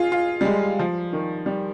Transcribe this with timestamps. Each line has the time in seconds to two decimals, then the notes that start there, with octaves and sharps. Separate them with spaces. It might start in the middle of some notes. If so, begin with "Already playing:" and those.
Already playing: F4 G#4
0.12 F4
0.41 G3
0.45 G#3
0.79 F3
1.13 D#3
1.46 G3